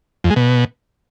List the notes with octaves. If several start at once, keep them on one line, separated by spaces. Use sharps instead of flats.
F2
G#3
B2